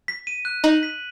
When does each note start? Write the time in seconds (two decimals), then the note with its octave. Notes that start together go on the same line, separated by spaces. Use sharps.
0.08 B6
0.27 D#7
0.45 F#6
0.64 D#4 F#7
0.83 B6